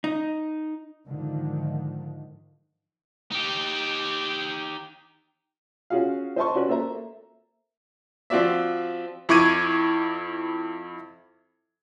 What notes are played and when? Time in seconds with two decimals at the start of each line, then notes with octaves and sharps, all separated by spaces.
0.04 D#4
1.06 G#2 D3 D#3 F3
3.31 D#4 G4
5.90 C#4 F4 F#4 G#4 F5
6.36 C5 D#5 E5 A5 C6 C#6
6.55 C#4 F#4 B4 D5
6.68 A#3 A4 C5 E5 A#5
8.30 F3 C4 F4 F#4 D5 E5
9.29 F2 E4 C#6 D6 G#6 D#7